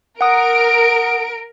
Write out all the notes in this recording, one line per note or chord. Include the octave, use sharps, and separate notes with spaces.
A#4 F#5 D#6 D7